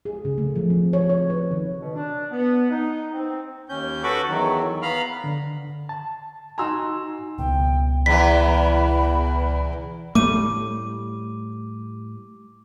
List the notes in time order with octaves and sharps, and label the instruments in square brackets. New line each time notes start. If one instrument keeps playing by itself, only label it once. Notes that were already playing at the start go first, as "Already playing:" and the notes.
[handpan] G#4
C#3
A3
F3
C4
C#5
C#5
B4
D#3
[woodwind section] B2
D4
B3
D#4
C4
[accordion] D#2 C#4 G6
F#4 A4 B4 B5 C#6 D6
E2 D#3 F#3
B3 F5 A#5 B5 F6
[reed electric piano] D3
A5
[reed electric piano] D#4 F#4 G#5 [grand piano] A#5 C6 E6
[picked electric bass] C#2 B2 [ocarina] G5
[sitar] E2 E3 [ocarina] B5 [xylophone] B6
[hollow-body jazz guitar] A2 G3 [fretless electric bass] A3 [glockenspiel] D6 D#7